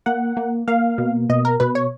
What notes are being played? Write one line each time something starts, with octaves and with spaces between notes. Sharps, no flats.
A#3 F#5
A#3
A#3 F5
B2
B2 D#5
A#4
B2 B4
C#5